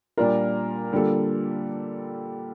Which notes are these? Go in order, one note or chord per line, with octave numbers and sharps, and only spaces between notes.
A#2 G3 D4 F4 A#4
D3 G3 A#3 F4 A4